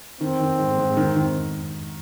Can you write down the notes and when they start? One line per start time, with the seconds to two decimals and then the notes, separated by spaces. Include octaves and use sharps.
0.21 D#3 C4
0.40 D#3
0.59 G#2
0.78 G#2
0.97 D#3
1.16 D#3